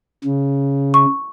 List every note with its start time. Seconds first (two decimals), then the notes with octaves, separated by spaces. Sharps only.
0.24 C#3
0.94 C#6